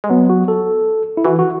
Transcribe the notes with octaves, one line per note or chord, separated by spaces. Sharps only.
G#3
F#3 B3
F#4
A4
E4
E3 F#4
F#4